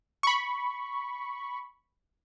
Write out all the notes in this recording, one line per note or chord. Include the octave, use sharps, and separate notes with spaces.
B5 C#6